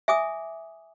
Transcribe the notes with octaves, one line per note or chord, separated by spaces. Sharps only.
E5 G#5 D6 D#6